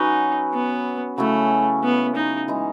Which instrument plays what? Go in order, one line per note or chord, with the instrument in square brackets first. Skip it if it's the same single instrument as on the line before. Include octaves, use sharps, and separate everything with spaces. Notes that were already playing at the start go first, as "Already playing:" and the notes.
Already playing: [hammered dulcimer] F#3 C#4 F#4 B4 [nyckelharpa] D#4
[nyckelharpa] B3
[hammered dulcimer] C#3 F#3 C#4 E4 [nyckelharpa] A3
[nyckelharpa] B3
D#4
[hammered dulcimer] E3 G#3 D#4